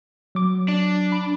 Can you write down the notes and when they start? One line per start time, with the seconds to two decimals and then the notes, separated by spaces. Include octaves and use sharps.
0.35 F#3 D6
0.68 D4
1.12 B5